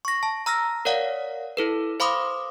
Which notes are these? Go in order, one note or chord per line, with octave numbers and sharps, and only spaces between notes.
C#6 A#6
A5
A#5 E6 F6 A#6
A#4 C#5 D5 F5 F#5
E4 A4 B4
C5 F5 B5 C6 D6 D#6